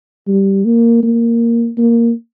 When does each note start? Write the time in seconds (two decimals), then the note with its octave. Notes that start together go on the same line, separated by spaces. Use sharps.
0.27 G3
0.65 A#3
1.03 A#3
1.78 A#3